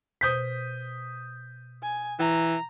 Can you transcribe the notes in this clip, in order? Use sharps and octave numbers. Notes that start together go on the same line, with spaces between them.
B2 C5 D#6 G6 B6
G#5
E3 A#5